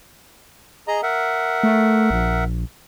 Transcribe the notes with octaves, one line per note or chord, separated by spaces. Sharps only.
G#4 D#5 A#5
A#4 E5 F#5
A3
A#1